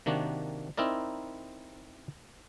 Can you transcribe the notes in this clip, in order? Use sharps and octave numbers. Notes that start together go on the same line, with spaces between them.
C3 D#3 A#3 D4 F#4
C4 D#4 E4 A#4 D5